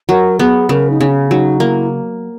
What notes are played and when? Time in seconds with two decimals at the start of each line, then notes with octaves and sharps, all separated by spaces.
0.09 F#3 A#4
0.39 B3 G#4
0.69 C#3 A#4
0.90 D#4
1.01 C#3
1.10 C#4
1.30 F#3 D#4
1.60 A#3 E4